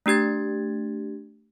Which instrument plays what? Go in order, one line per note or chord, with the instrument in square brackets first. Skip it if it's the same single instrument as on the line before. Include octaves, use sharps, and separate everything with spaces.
[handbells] A3 D4 G4 G#6 A6